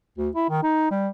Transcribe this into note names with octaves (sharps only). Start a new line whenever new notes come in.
D2
E4
D#3
D#4
G3